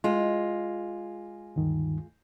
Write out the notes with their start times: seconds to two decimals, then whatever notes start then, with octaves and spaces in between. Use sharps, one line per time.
0.04 G#3 F4
1.56 D2 G2 D#3